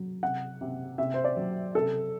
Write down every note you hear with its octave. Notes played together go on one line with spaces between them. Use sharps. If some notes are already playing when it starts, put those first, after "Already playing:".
Already playing: F#3
C3 F#5
C3
C3 E5
C5
D5
F#3
C3 A4